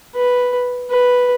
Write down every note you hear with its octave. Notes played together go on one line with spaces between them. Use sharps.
B4
B4